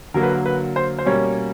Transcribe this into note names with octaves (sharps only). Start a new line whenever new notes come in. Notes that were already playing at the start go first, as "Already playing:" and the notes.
D3 F#3 A#3 A#4
B4
A#4
B4
C5
C5
B2 G3 A#3 C#4 C#5